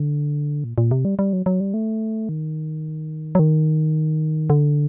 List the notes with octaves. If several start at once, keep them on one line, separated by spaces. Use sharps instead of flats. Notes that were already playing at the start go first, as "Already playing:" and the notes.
Already playing: D3
A#2
A#2
C3
G3
G3
F#3
F#3
G3
A3
D#3
F#3
D#3
D3